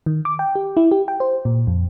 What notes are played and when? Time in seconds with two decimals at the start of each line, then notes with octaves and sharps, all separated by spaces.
0.06 D#3
0.25 D6
0.39 G5
0.55 G4
0.77 E4
0.91 G4
1.08 G5
1.20 C5
1.45 A#2
1.67 F2